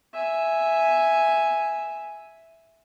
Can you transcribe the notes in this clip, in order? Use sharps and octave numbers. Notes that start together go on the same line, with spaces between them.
E5 G#5